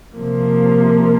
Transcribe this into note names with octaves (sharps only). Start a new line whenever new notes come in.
C3 F3 A#3